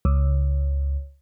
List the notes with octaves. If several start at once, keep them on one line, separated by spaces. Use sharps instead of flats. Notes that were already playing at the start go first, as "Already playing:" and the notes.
C#2